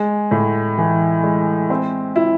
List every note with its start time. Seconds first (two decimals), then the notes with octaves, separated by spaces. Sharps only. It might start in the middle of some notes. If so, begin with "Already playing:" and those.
Already playing: G#3
0.31 A2
0.78 E3
1.23 G#3
1.70 C4
2.16 E4